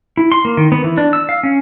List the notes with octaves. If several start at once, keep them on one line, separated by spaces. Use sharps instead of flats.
E4
C6
A#3
D#3
B3
E3
D4
E6
F5
C#4